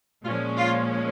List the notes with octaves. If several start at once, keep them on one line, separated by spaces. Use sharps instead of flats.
A#2 F3 G#3 C#4 F4
F4